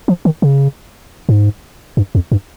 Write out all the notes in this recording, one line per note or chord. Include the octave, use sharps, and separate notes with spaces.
F3
D#3
C#3
G#2
G2
F2
G2